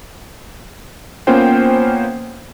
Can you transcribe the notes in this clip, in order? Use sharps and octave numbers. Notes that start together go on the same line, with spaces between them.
A#3 B3 C#4 F4 C5 G5